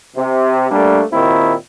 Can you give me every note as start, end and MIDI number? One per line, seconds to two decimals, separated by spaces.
0.16 0.66 48
0.71 1.02 55
0.71 1.02 57
0.71 1.02 58
0.71 1.02 62
1.12 1.54 39
1.12 1.54 46
1.12 1.54 51
1.12 1.54 60
1.12 1.54 64